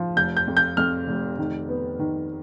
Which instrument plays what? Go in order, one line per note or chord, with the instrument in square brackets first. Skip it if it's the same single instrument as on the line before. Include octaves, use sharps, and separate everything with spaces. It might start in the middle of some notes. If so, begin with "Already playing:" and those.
Already playing: [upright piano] F3
[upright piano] F1 [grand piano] G6
[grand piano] G6
[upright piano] F2
[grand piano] G6
[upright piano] F2 [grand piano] F6
[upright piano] F1
D#3
B3
D#3